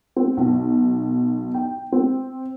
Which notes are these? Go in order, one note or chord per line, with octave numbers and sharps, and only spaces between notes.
C4
B1
G5
C4